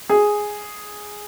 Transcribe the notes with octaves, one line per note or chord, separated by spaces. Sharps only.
G#4